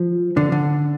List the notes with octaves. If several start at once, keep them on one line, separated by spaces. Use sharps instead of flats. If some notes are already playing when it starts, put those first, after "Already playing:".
Already playing: F3
D3
D3